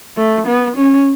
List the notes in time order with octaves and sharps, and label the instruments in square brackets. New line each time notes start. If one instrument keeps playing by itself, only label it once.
[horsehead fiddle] A3
B3
C#4